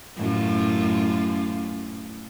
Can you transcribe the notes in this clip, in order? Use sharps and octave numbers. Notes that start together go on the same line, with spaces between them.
F#2 A2 F4